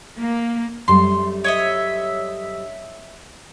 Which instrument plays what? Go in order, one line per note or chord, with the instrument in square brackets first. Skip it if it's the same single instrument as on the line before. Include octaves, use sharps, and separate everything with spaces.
[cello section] A#3
[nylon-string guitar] F#2 G3 A3 [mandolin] C6
[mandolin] C#5 D#5 E5